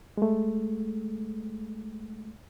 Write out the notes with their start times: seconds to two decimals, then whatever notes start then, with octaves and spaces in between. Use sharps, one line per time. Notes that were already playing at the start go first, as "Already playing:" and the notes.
0.18 G#3 A3